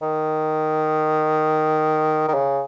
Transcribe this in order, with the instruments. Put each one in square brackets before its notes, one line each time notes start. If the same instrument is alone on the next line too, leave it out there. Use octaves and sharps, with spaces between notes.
[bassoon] D#3
D#3
C#3